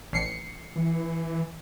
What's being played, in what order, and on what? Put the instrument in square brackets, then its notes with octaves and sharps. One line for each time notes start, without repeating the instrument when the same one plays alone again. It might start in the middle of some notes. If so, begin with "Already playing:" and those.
[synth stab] A1 C7 C#7
[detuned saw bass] E3